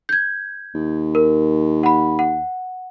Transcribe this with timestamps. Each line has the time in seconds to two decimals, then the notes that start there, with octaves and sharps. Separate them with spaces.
0.09 G6 G#6
0.74 D#2
1.15 A#4
1.83 F#5 B5
2.19 F#5